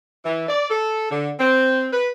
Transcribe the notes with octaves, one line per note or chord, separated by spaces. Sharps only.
E3
D5
A4
D3
C4
B4